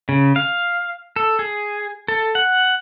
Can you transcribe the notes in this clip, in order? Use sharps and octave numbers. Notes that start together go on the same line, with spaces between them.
C#3
F5
A4
G#4
A4
F#5